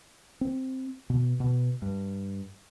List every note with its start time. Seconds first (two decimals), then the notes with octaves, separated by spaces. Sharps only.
0.41 C4
1.10 B2
1.40 B2
1.82 G2